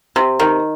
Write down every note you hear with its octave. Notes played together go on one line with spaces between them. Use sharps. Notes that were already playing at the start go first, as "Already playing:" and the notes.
C3
D#3